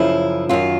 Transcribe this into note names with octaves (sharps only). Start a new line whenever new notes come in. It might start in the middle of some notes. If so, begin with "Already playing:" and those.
Already playing: F#2 C#3 F3 E4
F#2 D#3 F4